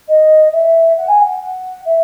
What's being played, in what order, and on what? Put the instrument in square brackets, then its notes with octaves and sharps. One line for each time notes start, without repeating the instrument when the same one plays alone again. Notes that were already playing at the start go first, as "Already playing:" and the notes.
[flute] D#5
E5
F#5
G#5
F#5
F#5
E5